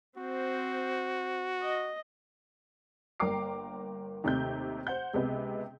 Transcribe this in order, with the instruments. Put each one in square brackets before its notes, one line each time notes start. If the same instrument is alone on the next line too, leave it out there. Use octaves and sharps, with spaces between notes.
[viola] C4 C5 [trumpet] F#4
[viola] D#5
[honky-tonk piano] G1 A#3 G5 A#5 D6 C7
D#2 C3 A3 C4 G6
C5 F#5 G6
C#2 C3 G#3 B3